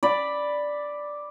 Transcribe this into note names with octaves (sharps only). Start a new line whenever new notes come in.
D5 B5